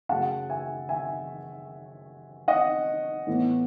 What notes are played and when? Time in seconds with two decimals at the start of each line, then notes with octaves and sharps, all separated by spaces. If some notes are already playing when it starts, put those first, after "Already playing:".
0.09 F#2 C#3 F#3 A3 F#5 A5
0.49 E5 G#5
0.89 E5 G#5
2.48 D#5 F#5
3.27 A2 E3 B3